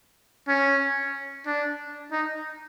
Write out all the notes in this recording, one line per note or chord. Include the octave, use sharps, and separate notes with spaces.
C#4
D4
D#4